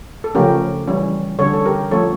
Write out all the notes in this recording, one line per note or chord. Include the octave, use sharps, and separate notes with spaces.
A4
C#3 F3 A3 C#4 G4 A#4
E3 G3 C#4
D3 G3 C#4 A4 C#5
A4
G4 A#4
F3 A3 C#4 A4 C#5